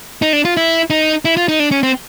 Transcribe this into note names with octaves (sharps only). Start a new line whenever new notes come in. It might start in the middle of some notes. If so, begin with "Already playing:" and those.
D#4
D4
F4
E4
D#4
E4
F4
D#4
D4
C#4
C4